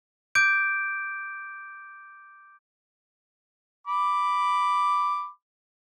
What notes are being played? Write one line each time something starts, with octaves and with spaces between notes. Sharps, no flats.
D6 G6 D7
B5 D6